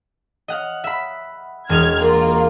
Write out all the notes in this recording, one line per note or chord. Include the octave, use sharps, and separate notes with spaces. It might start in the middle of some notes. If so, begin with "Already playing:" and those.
D#5 F#5 F6
E5 B5
E1 D#5 F6 G#6
A#3 F4